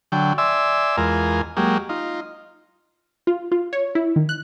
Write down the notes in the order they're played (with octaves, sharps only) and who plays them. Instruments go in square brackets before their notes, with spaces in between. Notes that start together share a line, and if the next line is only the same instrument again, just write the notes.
[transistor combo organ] D3 F#3 G5
D5 E5 G#5 C6 E6
E2 G#3 F4 A#4 G#5
F#3 G#3 A#3 G4
D#4 F4
[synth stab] F4
F4
C#5
E4
D#3
F#6